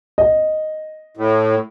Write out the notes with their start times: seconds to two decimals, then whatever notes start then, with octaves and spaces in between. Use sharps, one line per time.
0.18 D#5
1.17 A2